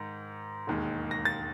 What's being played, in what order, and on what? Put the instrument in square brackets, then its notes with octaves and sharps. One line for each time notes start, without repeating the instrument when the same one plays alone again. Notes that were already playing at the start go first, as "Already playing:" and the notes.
Already playing: [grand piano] G#2 D#3
E1 D#2 D#3 G#3
A#6
A6